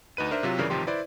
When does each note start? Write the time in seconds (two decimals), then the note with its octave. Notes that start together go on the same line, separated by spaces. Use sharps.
0.17 D2 D#4 B4 D#7
0.31 D4 A#4 C5 E5
0.43 C3 F#3 F4
0.58 G2 C#3 E3 A#4 D5
0.70 A1 C3 D#3 F3 G4 C6
0.87 E4 B4 C5 D5